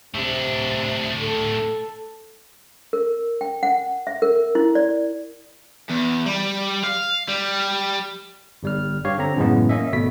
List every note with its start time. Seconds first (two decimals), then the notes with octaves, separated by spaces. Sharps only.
0.15 A2 C3 D4
1.20 A4
2.93 A#4
3.41 G5
3.63 F#5
4.07 E5
4.22 A#4
4.55 E4
4.75 D5
5.90 E2
6.26 G3
6.83 F5
7.29 G3
8.63 G1 G3 F6
9.05 G2 G4 C#5 F5
9.18 D3 C4 A#5
9.36 F#2 A2 C#3 E3 G#3 B3
9.69 A#3 C#4 D#5 E5
9.92 G#1 B2 A3 B6